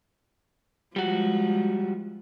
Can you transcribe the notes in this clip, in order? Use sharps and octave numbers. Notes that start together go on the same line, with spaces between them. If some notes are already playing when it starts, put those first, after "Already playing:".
F3 G3 G#3 F#4